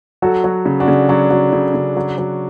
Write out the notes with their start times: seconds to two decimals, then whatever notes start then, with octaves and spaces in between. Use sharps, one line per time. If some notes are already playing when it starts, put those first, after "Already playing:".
0.22 F#3 F#4 A4
0.44 F#3
0.66 C#3
0.80 D4 F#4
0.88 C#3
1.09 F#3 D4 F#4
1.31 F#3
1.53 C#3
1.74 C#3
1.97 F#3
2.18 F#3